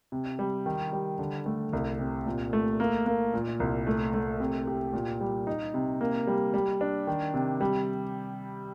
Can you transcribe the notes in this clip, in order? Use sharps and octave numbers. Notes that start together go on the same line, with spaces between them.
C3
G3
D#3
G3
D3
A3
C2
C3
A#2
A3
A#3
A#3
A#2
C2
A3
A3
C3
G4
A#2
G3
D#4
C3
A#3
G3
G3
D4
D#3
C3
G3